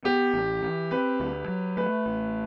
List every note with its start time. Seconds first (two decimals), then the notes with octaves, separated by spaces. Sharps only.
0.05 B3 G4
0.33 A1
0.62 E3
0.91 C4 B4
1.20 D2
1.48 F#3
1.77 A3 B4
2.06 A1